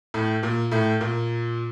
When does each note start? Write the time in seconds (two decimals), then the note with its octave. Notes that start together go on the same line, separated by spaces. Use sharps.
0.14 A2 A3
0.43 A#2 A#3
0.71 A2 A3
1.00 A#2 A#3